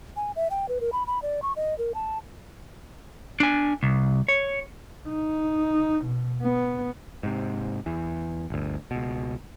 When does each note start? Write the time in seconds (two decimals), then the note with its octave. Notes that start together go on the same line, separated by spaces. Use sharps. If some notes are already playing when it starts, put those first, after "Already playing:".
0.16 G#5
0.36 E5
0.50 G5
0.69 B4
0.81 A#4
0.93 B5
1.07 B5
1.22 D5
1.42 C#6
1.56 D#5
1.78 A#4
1.94 A5
3.40 D4 G#5
3.83 C2
4.28 C#5
5.09 D#4
6.05 B2
6.42 B3
7.23 G#2 C3
7.86 E2 E3
8.50 G1 D2
8.91 C#2 B2